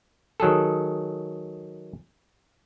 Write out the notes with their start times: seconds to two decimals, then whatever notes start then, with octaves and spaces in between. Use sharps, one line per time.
0.40 D#3 F#3 G#4 A4